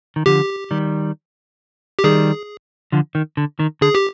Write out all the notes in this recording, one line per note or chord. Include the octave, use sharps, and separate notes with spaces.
D#3
D3 F3 G4
D#3 G3
G4
D#3 G3 G#4
D3 F3
D#3
D3
D#3
D3 G#4
G4